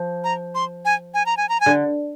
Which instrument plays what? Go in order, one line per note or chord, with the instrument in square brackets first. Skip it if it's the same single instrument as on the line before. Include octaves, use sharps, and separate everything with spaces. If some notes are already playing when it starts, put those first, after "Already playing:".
Already playing: [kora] F3
[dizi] A#5
C6
G#5
G#5
A#5
G#5
A#5
G#5
[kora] D3